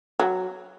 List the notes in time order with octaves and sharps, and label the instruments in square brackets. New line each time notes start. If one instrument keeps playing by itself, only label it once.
[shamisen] F#3